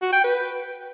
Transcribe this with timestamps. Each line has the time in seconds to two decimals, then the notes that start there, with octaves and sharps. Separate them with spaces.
0.02 F#4
0.13 G5
0.24 B4